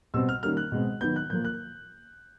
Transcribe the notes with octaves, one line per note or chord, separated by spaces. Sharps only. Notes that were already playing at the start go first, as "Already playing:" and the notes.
B2 G3 C4 E6
F6
D#3 G3 A#3 C#4 F6
F#6
B2 G#3 C4
D#3 F#3 B3 G6
F#6
A#2 F3 A#3 G6
F#6